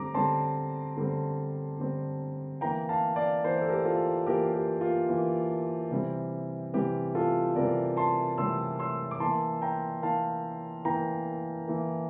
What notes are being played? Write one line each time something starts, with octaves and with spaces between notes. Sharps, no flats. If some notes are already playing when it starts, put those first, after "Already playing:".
Already playing: D3 G3 C4 A#5 D6
D3 G3 C4 A5 C6
D3 G3 C4
D3 G3 C4
E3 A#3 G5 A#5
F5 A5
D5 F5
E3 A#3 C5
A#4
A4
G4 A#4
F4 A4
E3 A#3 G4 A#4
G4
F4
E3 A#3
C3 E3 G3 C4
C3 E3 G3 C4 G4
F4 A4
C3 E3 G3 C4 A#4 D5
A5 C6
C3 E3 G3 C4 C6 E6
C6 E6
D6
E3 A#3 A5 C6
G5 A#5
E3 A#3 F5 A5
E3 A#3 G5 A#5
E3 A#3